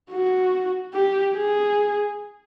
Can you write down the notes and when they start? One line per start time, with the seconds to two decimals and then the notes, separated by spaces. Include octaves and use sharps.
0.11 F#4
0.94 G4
1.35 G#4